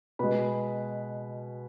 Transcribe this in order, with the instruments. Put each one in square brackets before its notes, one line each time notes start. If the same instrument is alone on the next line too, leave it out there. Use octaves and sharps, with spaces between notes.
[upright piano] B2 G#3 B4 B5